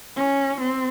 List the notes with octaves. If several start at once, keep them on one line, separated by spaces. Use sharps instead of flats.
C#4
C4